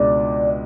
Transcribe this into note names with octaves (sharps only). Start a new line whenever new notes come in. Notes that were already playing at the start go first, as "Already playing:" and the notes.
Already playing: C#2 B2 G#3 D4 D5